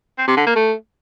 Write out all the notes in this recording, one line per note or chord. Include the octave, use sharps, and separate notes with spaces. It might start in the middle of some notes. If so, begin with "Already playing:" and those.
C4
C3
D3
A#3
A3